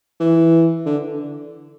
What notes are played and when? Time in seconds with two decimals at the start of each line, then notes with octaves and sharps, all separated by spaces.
0.20 E3
0.85 D3